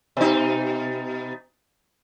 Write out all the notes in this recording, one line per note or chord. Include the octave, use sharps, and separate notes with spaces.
B2 D#4